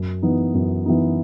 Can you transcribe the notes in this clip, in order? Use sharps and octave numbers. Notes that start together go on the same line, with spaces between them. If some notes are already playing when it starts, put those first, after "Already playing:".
Already playing: F#2
E3 B3 D#4
F#2
E3 B3 D#4